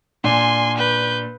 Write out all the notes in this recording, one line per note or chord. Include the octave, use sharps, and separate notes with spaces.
A#2 D4 G#5 C6
B4 G6